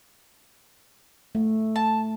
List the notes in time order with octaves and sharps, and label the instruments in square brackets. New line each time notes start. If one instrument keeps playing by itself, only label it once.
[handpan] A3
[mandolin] A5